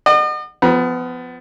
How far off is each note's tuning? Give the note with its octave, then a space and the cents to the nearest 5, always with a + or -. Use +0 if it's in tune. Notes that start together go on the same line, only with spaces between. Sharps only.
D#5 -45 F#5 +5
F3 +0 B3 +25 B5 -45